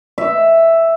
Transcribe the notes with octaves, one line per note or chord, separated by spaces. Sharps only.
E5